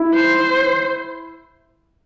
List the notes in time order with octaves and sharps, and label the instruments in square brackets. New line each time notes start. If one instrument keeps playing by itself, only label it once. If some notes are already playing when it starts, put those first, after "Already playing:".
Already playing: [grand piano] E4
[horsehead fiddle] C5